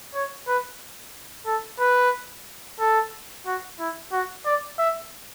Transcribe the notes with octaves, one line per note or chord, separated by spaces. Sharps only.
C#5
B4
A4
B4
A4
F#4
E4
F#4
D5
E5